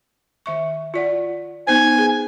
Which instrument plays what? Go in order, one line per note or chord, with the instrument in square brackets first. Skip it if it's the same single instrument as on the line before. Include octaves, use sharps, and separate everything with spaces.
[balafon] D#3 E5 C#6
F4 D5 F#5
[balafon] B3 D#4 C5 [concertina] G#5
[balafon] G#4 B4